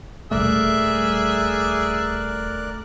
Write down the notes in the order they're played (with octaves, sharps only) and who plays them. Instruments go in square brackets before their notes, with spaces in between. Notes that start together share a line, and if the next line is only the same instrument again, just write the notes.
[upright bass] D#1 G3 [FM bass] A3 [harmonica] G#4 E5 [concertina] A#4 D5 F#6